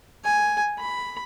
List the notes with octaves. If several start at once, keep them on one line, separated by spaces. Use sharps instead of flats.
G#5
B5